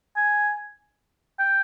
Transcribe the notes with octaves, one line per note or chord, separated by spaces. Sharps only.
G#5
G5